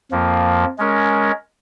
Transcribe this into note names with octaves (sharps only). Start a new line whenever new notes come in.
F2 F3 A#3
G#3 C#4 A#4